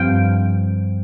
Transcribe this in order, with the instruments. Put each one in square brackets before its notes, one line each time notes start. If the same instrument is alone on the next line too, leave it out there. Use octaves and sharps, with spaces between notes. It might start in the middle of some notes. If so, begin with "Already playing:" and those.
Already playing: [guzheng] G2 F3 C4 F5 G5